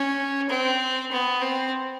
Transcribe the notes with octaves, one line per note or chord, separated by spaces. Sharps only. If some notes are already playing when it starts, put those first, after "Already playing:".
Already playing: C#4
C4
B3
C4